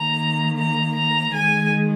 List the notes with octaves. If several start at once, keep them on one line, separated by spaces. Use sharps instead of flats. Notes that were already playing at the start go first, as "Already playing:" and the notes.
Already playing: D#3 A#3 A#5
A#5
A#5
D#3 G#3 G#5